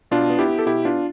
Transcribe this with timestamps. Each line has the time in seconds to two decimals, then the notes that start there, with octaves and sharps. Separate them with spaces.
0.11 B2 D4 F4
0.30 B3
0.39 E4 G4
0.48 B3
0.59 A4
0.66 B2 E4 G4
0.85 B3 D4 F4